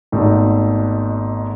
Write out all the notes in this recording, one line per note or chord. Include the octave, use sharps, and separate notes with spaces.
G#1 G#2 B2 A3